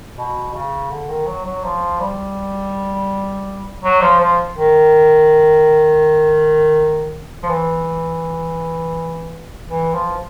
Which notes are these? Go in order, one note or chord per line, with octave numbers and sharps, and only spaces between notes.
B2
C#3
D3
D#3
F#3
F#3
F3
G3
F#3
F3
F3
D#3
F3
E3
E3
F3